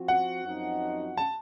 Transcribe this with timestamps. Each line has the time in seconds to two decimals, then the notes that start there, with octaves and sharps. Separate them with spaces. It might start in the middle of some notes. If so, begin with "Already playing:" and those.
Already playing: F3 C4 F#4
0.08 F#5
0.44 F#2 F3 C4 D#4 F#4
1.17 A5